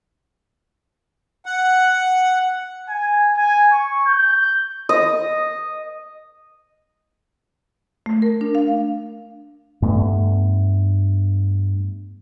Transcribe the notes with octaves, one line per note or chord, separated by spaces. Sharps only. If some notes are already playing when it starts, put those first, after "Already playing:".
F#5
G#5
G#5
C#6
G6
D#5
A3
A#4
D4
F5
G2 A3 B3